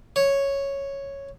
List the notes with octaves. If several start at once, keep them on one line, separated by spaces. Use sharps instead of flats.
C#5